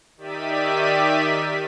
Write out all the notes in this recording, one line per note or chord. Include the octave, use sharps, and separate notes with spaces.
D#3 G4 D5 E5 B6 D#7